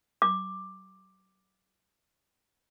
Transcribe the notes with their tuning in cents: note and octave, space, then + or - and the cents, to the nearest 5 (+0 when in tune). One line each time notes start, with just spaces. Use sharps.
D6 +10